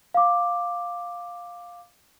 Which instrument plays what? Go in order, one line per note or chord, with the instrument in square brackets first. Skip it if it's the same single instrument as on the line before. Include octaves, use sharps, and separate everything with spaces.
[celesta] F5 D6